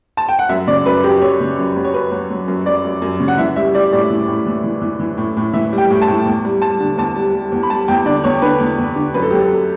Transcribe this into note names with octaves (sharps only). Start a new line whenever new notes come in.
A5
G5
F#5
F#2 E5
C#3 D5
F#2 B4
F#2 G4
F#2 C#5
C#3
F#2
F#3
C#5
F#2 B4
F#3
F#3
F#2
F#2 D5
F#2
F#2
C#3
F#5
E3 E5
G3 E5
G3 D5
A2 D5
E3
A2
E3
E3
E3
E3
A2
A2
E3 E5
G3
G5
A2
A5
A2
E2
G3
G3 A5
D3
E2 A5
G3
G3
E2
B5
G3 A5
E2 G5
D3 D5
E2 C#5
D3 B4
E2
E2
D3
F#2 B4
A4
F#3 G4
A4
F#2